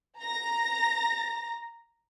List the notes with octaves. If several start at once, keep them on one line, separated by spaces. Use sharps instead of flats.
A#5 A#6